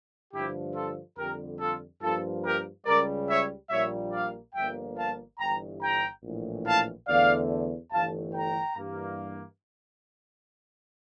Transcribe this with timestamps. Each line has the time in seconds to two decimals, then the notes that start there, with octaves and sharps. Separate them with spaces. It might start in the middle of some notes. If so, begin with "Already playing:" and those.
0.33 G2 D3 F3 A3 E4 G4
0.75 F4 A4
1.17 F2 D3 G3 G4 A#4
1.59 F4 A4
2.01 G2 F3 A#3 F4 A4
2.43 G4 A#4
2.86 C#2 C#3 G3 A#4 D5
3.28 C#5 E5
3.70 A#1 A#2 G3 A#3 C#5 E5
4.12 D5 F5
4.54 G1 G2 F3 A#3 E5 G5
4.97 F5 A5
5.39 G1 G2 E3 G5 A#5
5.81 G5 A#5
6.23 A#1 A2 E3
6.65 F5 A5
7.07 E2 D3 A3 D5 F5
7.91 G1 G2 E3 A3 F5 A5
8.34 G5 A#5
8.76 G2 E3 A#3